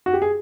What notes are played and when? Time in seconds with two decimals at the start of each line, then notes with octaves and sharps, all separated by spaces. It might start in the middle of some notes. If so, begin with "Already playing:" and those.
0.06 F#4
0.13 G4
0.22 G#4